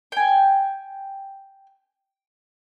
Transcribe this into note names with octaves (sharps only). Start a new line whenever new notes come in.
G5 G#5